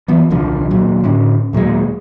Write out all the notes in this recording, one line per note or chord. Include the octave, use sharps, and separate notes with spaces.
E3 F3 B3
D#1 C2 D3 F3
D#1 A#2 F#3
A2 D3 C#4
D#2 A#2 F#3 G#3